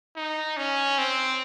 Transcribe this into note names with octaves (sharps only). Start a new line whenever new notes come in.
D#4
C#4
C4